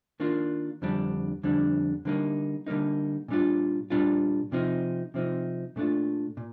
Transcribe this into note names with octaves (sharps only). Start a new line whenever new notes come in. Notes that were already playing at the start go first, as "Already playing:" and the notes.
D#3 A#3 D4 F4
F2 D3 G3 D4
F2 D3 G3 D4
D3 G3 A#3 D#4
D3 G3 A#3 D#4
A#2 G3 D4 F4
A#2 G3 D4 F4
C3 F3 C4 D#4
C3 F3 C4 D#4
A#2 A3 D4 F4
A#2